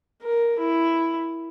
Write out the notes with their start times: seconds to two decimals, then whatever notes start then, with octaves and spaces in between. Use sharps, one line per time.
0.23 A#4
0.59 E4